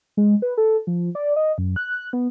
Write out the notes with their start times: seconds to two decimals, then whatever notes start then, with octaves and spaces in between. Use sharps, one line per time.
0.17 G#3
0.42 B4
0.57 A4
0.87 F3
1.15 D5
1.36 D#5
1.58 F#2
1.76 F#6
2.13 B3